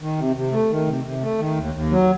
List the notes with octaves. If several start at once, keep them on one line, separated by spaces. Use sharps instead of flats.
D#3
C3
C3
A3
D#3
C3
C3
A3
D#3
D#2
D#2
F#3